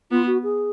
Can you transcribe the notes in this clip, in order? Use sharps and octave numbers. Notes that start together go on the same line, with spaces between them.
B3 F4
F#4
G#4